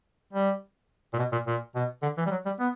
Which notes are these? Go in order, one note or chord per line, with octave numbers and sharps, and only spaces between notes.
G3
A#2
B2
A#2
A#2
B2
D3
E3
G3
F#3
G3
B3